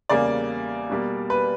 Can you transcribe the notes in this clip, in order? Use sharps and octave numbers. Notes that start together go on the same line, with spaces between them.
E2 C#3 G3 A#3 D5
B2 G3 A#3
B4